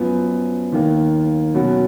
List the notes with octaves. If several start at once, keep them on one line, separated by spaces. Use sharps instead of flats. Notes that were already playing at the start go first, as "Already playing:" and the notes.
Already playing: F#2 F3 B3
D#2 D#3 A#3
B2 F#3 C#4 F#4